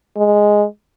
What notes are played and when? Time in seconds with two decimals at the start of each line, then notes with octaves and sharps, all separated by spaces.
0.17 G#3